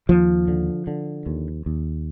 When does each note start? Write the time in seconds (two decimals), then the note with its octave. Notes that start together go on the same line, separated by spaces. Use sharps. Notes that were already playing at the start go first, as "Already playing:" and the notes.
0.09 D#2 F3
0.48 D3
0.87 D3
1.26 D#2
1.66 D#2